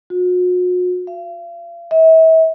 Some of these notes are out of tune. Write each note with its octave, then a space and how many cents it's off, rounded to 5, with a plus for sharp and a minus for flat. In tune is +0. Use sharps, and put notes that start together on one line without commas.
F#4 -40
F5 -40
E5 -35